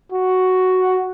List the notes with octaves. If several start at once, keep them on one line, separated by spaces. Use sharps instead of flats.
F#4